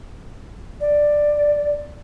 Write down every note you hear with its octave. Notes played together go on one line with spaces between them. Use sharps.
D5